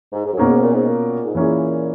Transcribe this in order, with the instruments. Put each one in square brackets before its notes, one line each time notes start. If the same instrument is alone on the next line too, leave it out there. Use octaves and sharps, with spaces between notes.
[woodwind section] G#2
G#2
F#2
[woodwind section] G#2 [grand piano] B2 A#3 C#4 G#4
[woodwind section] G#2
A#2
G#2
A#2
G#2
[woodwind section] A#2 [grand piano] E3 A#3 C#4 E4 G#4